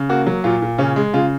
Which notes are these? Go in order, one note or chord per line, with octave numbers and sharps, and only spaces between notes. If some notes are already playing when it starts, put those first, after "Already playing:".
Already playing: C#3
A#3 F#4
F#3
A#2 F4
A#2
C#3 C#4
G#3
C#3 F4